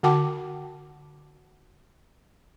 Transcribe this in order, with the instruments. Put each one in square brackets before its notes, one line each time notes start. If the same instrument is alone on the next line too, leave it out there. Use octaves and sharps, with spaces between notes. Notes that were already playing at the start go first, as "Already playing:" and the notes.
[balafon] D3 F#4 F#5 G5 A5 D6